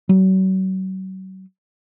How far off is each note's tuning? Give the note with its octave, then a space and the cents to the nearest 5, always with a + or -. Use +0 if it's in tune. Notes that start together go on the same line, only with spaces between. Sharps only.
F#3 +35